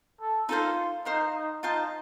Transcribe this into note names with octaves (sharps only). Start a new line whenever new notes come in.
A4
D#4 F4 A4 C5 F5
D#4 C5 F5 C6
D#4
D#4 F4 C5 F5 A5